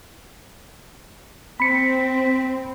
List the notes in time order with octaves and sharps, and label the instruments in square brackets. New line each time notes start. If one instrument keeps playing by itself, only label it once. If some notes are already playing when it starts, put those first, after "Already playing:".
[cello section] C4 [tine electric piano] B5 C#7 [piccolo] B6